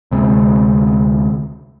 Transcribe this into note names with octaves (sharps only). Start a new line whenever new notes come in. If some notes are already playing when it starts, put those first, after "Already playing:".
D2 C3 G#3